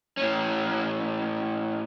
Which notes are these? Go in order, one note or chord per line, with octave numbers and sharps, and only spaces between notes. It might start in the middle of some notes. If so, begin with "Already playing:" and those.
A2 C#4